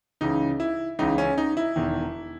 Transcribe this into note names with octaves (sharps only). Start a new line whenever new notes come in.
C#2 C#3 E3 D#4
E4
C#2 C#3 E3 D#4
C#4
D#4
E4
E1 E2 D#3